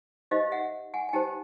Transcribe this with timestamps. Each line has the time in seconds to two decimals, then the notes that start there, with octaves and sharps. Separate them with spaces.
0.31 D#4 G4 C5 D#5 F5
0.52 E5 F#5
0.94 F#5 G#5
1.09 G#5
1.13 D#4 G4 C5 G5 A5